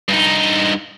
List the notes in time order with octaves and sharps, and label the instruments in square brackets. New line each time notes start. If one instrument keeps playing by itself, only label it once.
[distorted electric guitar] G2 D#4